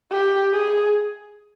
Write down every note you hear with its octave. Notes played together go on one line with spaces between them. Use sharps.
G4
G#4